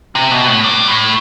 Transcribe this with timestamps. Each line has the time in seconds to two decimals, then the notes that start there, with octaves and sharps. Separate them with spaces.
0.15 C3
0.31 B2
0.48 A2
0.64 G2
0.88 A2